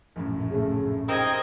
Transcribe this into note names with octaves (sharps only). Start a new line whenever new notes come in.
A#1 F#2 A2
C#3 A3
C4 D#4 G4 A#4 D#5 G5 G#6